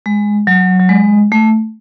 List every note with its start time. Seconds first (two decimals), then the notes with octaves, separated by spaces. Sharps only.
0.06 G#3
0.47 F#3
0.79 F#3
0.89 G#3
1.32 A3